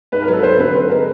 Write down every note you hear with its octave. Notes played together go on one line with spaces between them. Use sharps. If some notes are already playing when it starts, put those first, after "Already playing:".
G#2 B4
A#4
F#3
A4
B4
F#3 C5
D3 B4
C4 B4
G#3 A#4